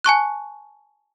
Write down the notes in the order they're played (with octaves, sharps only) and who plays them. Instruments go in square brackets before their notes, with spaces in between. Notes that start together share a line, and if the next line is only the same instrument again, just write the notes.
[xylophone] G#5 A5 C#6 F#6